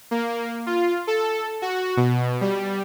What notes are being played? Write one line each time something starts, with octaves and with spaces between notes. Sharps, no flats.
A#3
F4
A4
F#4
B2
G3